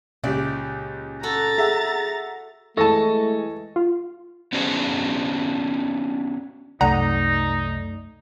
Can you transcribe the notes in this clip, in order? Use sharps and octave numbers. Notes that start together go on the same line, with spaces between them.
C#2 A#2 G4 D5
F#4 A4 A#5 A6
G#4 E5 F#5
E3 G#3 A3 A4 A5 C#6 A#6
F4
B3 C#4 D4 F#4 G#4 C5
C2 F#2 A3 D#4 D5 F#5 A#5